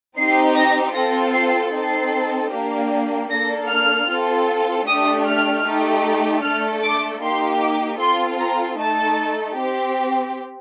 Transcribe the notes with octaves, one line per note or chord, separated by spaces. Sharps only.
C4 D#4 G4 C7
A#6
C4 F4 A4 A#6
C7
C4 D#4 A4 C7
A#3 D4 G4
A#3 D4 A4 A#6
F6
C4 F4 A4
A3 D4 G4 D#6
F6
A3 D#4 G4
A3 D4 A4 F6
D6
A#3 D#4 G4 C6
D6
C4 F4 A4 C6
A#5
A3 D#4 A4 A5
C4 G4